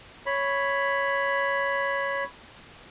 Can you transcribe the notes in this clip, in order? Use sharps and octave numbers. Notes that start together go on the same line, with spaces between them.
C#5 B5